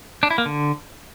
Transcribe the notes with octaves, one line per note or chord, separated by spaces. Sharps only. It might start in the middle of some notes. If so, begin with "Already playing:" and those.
D4
E4
A#3
D3